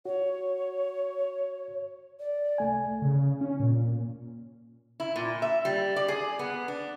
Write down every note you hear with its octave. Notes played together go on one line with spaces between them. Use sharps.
F#4 C#5
D5
C2 A3 G#5
C#3
C#4
A#2
E4
A#2
E5
G3
D5
G#4
B3
D4